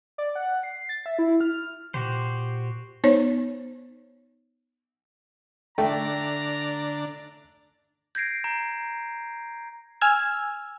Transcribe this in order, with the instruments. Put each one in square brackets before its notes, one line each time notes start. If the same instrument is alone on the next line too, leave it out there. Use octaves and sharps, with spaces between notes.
[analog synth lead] D5
F#5
C7
A6
E5
E4
F6
[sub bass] A#2 [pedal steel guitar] F#4 G4 C5
[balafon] B3 D#4 C5 C#5
[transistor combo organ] D3 D4 D5 [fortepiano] A3 [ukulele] G5 [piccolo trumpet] A#5
[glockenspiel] G6 G#6 A#6 C7 D7
A#5
[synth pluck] G#5 E6 F6 G#6